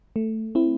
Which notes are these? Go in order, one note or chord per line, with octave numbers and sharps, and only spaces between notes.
A3
C4 E4